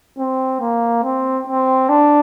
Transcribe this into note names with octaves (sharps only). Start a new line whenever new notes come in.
C4
A#3
C4
C4
D4